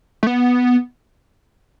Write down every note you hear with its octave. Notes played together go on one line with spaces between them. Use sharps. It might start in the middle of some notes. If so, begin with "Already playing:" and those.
A3
B3